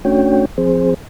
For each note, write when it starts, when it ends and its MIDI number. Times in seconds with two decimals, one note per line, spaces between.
0.05 0.45 57
0.05 0.45 61
0.05 0.45 62
0.05 0.45 66
0.05 0.45 73
0.05 0.45 79
0.58 0.94 53
0.58 0.94 60
0.58 0.94 68
0.58 0.94 72